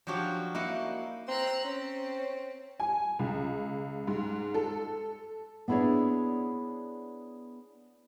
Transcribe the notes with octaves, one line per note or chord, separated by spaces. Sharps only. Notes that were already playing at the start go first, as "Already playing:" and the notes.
F3 F#3 D4 F#4 G4 C#5
A#3 D#4 E4 F#5
C4 A#5 E6 F#6
C4 C#4
G#5
C#2
G#2
A4
B3 D4 E4 G#4 C#5 D5